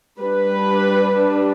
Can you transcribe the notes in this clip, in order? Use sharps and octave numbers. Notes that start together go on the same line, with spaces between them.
G3 D4 B4